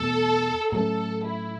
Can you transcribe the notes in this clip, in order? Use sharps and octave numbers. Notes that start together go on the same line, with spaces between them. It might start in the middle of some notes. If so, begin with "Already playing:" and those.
Already playing: E2 B2 A3 A4
A2 F#3 A3 C#4 A4
E4